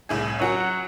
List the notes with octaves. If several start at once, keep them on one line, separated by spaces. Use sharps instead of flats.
C2 A2 G#4
F#3 C#4 F#4